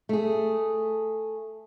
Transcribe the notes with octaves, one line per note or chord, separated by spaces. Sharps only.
A3 G#4